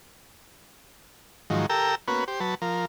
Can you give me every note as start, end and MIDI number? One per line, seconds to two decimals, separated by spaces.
1.50 1.66 44
1.50 1.66 51
1.50 1.66 53
1.50 1.66 54
1.70 1.95 67
1.70 1.95 69
1.70 1.95 70
1.70 1.95 79
1.70 1.95 82
1.70 1.95 88
2.08 2.24 58
2.08 2.24 59
2.08 2.24 61
2.08 2.24 66
2.08 2.24 71
2.28 2.40 67
2.28 2.40 72
2.40 2.55 54
2.40 2.55 71
2.40 2.55 81
2.62 2.85 53
2.62 2.85 70